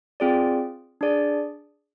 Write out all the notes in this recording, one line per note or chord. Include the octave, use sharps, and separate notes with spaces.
C4 F4 G#4 D5
D4 G#4 D5